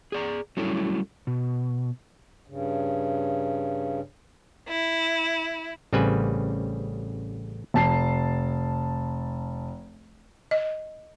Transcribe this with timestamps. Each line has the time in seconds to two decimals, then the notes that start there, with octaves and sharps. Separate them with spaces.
0.12 G#4 D5 A#5
0.57 F#3 G3 A3 C#4 E4 A4
1.27 B2
2.46 G2 C#3
4.69 E4
5.93 A1 C#3 G3 C4 B4 G#5
7.74 F1 A5 C7
10.51 D#5